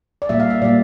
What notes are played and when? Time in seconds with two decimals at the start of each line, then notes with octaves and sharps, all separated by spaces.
0.22 D5
0.29 A#2 G3 A#3 E5
0.40 F5
0.50 E5
0.62 A#2 G3 A#3 D5